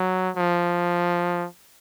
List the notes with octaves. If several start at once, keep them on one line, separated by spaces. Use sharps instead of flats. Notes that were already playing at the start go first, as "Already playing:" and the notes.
Already playing: F#3
F3